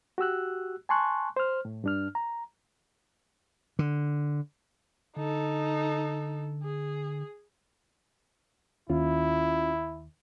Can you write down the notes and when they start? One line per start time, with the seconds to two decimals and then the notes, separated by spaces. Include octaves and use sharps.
0.18 F#4 G4 E6 F#6
0.89 G#5 A5 C6 C#6 F#6
1.36 C5 F6
1.65 A2
1.84 G2 D4 F6
2.15 A#5
3.79 D3
5.16 D3 D#4 A4
6.64 G#4
8.90 D#2 C#4 E4 F4